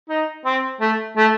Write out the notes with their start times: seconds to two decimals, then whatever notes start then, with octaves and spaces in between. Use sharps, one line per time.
0.10 D#4
0.45 C4
0.81 A3
1.17 A3